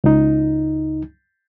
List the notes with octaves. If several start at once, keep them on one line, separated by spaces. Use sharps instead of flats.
C#2 D#4